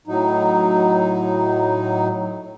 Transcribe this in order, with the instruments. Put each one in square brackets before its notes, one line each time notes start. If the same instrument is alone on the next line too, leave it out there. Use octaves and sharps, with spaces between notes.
[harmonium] A2 F#3 D#4